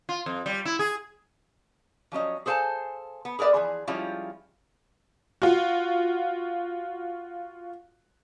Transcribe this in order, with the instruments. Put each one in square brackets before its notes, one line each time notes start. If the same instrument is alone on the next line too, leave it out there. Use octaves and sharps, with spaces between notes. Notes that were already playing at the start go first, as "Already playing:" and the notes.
[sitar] F4
F2
G3
E4
G#4
[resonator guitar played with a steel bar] F3 F#3 C#4 D#5
G#4 A4 C5 F5 G#5 A5
B3
G#4 A#4 B4 D5 E5
E3 F3 G#4
F3 G3 G#3 C#4 E4 F4
[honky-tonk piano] F4 F#4